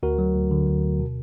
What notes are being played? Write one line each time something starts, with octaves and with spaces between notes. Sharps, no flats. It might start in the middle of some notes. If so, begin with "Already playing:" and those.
D2 F#4 A#4
F#3
D2
D3
D2
D2
B2